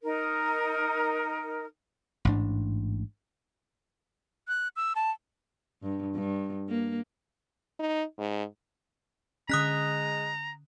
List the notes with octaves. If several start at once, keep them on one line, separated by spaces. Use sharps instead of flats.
D#4 A#4
A1 G#2 D4
F#6
E6
A5
G2
G2
A#3
D#4
G#2
D3 G#3 C#4 A#5 D#6 F#6 B6